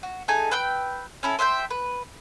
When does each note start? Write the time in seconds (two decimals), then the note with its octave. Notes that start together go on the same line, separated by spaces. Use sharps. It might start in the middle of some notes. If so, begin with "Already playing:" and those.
0.03 F#4
0.28 A3 D#4 G#4 G#5
0.51 B4 G5 E6 G6
1.23 C#4 E4 A4
1.39 C5 E5 F5 G5
1.70 B4